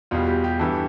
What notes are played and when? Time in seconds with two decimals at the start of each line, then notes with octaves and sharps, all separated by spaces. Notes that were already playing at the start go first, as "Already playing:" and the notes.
0.11 E2 B2 G3 F4
0.27 G4
0.44 G4
0.60 G2 E3 G3 A4